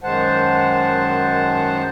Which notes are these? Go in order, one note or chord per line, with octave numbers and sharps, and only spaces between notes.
F#2 D#3 G#3 C5 F#5 A5